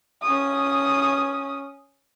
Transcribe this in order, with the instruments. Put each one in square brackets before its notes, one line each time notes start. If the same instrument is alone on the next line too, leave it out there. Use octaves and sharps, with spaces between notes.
[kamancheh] C#4 D#6